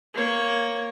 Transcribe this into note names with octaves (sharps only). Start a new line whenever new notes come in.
A#3 C#5